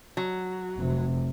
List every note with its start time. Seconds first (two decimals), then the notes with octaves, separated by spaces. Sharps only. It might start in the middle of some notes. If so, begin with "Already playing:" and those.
0.17 F#3
0.78 F1 C3